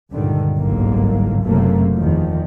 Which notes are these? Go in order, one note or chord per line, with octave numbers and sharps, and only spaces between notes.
C#2 G2 A#2 D3 D#3
G1 C2 G#2 D3 F#3 A#3
F#1 F#2 C3 F#3 A3 A#3
E2 D#3 F3